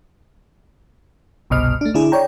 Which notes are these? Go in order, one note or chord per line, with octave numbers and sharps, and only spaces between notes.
G1 C2 B2 D#5 F6
A3 D4
D3 D4 E4 G#4
C#5 D5 G5 A#5